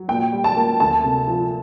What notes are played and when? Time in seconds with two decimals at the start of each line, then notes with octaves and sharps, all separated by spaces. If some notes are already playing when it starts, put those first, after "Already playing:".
Already playing: F#3
0.08 A#2 G5
0.33 G3
0.44 A5
0.57 A#3
0.80 D2 A5
1.04 C3
1.28 F3